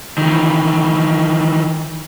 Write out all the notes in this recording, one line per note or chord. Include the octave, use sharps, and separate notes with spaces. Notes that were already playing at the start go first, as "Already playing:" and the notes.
D#3 E3